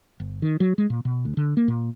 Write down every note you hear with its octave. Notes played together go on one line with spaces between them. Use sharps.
G1
D#3
F#3
G#3
A#2
B2
D2
D3
A#3
A#2